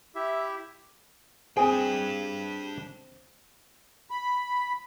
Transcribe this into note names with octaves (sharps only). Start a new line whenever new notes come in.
E4 G4 E5
C4 D4 G#4 C5 G5
B5